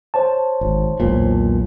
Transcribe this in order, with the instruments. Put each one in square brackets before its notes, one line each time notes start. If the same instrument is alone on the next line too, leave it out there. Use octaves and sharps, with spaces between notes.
[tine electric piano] C5 C#5 A5
[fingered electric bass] G#1
E1 B1 A#2